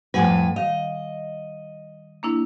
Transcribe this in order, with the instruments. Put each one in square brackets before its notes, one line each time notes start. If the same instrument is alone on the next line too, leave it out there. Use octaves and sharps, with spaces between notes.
[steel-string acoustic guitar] F2 A2 B4 [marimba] G3 F#5 G#5
[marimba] D#3 F5 [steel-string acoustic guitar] D#5
[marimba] A#3 D4 E4